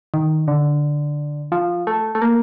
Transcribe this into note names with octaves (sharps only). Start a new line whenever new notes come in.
D#3
D3
F3
A3
A3
A#3